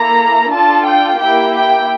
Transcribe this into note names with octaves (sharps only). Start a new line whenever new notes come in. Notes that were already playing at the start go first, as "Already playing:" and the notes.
Already playing: A#3 E4 A4 A#5
D4 F4 A4 A5
G5
A#3 E4 G4 G5
G5